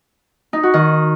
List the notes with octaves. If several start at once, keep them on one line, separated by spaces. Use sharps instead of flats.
D#4
F#4
D#3